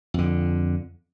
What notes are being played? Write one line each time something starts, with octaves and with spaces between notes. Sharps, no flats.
F2 D3